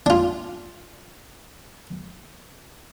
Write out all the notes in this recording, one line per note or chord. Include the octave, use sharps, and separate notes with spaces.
D4 F4